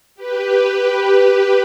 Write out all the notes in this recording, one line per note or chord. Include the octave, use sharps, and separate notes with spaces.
G4 B4